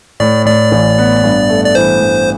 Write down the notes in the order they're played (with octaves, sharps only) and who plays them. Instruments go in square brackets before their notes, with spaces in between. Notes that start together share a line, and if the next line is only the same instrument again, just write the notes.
[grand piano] A2 [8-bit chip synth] D5
[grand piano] A2 [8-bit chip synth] D5
[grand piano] A1
B3
G2
A3
[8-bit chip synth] D5
[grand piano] E3 [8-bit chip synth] C5
[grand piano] G2